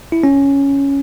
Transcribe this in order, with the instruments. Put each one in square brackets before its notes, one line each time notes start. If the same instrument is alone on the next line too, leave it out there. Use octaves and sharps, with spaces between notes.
[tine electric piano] E4
C#4